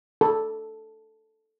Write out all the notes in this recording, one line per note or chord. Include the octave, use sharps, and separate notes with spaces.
A4